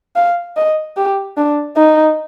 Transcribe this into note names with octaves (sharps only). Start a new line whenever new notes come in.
F5
D#5
G4
D4
D#4